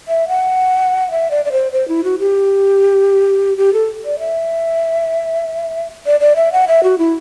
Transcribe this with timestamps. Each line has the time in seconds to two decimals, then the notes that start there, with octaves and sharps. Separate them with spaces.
0.08 E5
0.28 F#5
1.11 E5
1.31 D5
1.45 D5
1.52 C5
1.72 C5
1.88 E4
2.04 F#4
2.19 G4
3.57 G4
3.73 A4
4.05 D5
4.19 E5
6.06 D5
6.20 D5
6.36 E5
6.52 F#5
6.68 E5
6.83 F#4
6.98 E4